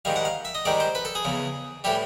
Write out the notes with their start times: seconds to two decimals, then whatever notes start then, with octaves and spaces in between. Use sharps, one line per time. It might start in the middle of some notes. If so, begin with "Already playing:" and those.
0.05 G#2 D#3 G3 F5
0.16 F#5
0.25 F5
0.45 E5
0.55 D#5
0.65 G#2 D#3 G3 D5
0.80 C5
0.95 B4
1.05 A4
1.15 G#4
1.25 E2 C#3 E3
1.84 A2 E3 G3 G4